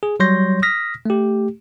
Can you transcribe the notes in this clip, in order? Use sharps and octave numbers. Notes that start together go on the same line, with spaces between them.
G#4
F#3 G3 C#5 C6 G6 A#6
D#6 F6 A#6 B6
A3 G4